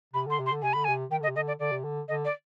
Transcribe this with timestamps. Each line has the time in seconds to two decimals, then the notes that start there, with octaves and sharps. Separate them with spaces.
0.14 C3 B5
0.27 D3 C6
0.39 C3
0.46 C6
0.52 D3
0.63 C3 G#5
0.73 D3 B5
0.84 G#5
0.89 C3
1.11 D#3 G5
1.20 D3 D#5
1.28 C3
1.36 D3 D#5
1.48 D5
1.60 D3 D5
1.72 C3
1.84 D3
2.08 D3 D#5
2.25 D5